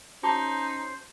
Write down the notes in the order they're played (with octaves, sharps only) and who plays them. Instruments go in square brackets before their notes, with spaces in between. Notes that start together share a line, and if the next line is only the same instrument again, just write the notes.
[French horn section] C#4 [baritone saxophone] D#4 [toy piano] F#4 A5 D6 [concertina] C5